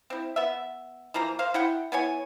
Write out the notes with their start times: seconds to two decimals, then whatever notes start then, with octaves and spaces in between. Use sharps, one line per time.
0.10 C4 E4
0.36 B3 E5
1.14 E3 F3 A#3 A#5
1.39 A#3 C5 F5
1.54 E4 F#5 G5
1.92 B3 E4 C#5 G#5